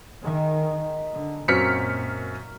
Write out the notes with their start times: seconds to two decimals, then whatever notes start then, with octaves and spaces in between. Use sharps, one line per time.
0.24 D#3 G#3 D#4 E5
1.14 D3
1.48 F#2 A#2 F#3 A#3 C4 F6 B6 C#7